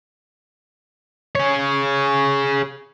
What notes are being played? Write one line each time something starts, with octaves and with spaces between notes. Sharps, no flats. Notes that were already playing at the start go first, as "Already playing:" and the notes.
G#4 C#5